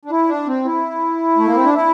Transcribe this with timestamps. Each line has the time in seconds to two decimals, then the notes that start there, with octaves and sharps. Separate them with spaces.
0.05 D4
0.11 E4
0.28 D4
0.47 C4
0.65 E4
1.37 A3
1.46 A#3
1.55 C4
1.65 D4
1.73 E4